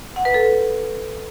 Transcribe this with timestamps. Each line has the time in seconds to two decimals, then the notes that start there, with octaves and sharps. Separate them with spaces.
0.16 F#5
0.25 B4
0.34 A4